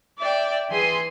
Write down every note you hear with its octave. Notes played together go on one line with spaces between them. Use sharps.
D5 E5 G5
E3 G#4 G#5 C6 D#6